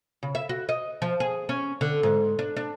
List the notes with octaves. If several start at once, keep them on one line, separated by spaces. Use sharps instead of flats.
C#3
E5
F#4
D#5
F3
G#4
C#4
D3
G#2
D4
D4